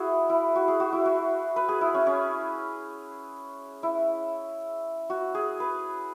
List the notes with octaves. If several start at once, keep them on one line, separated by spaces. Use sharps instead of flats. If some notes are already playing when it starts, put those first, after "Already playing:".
Already playing: E4 F#4 G#4 B4
E4
F#4
G#4
F#4
E4
F#4
B4
G#4
E4
C#4
C#4
E4
F#4
G#4
B4